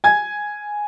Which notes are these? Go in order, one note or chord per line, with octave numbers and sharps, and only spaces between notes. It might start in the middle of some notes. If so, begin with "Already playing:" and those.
G#5 G#6